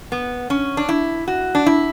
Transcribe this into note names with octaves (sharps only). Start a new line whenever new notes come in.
B3
C#4
D4
E4
F#4
D4
E4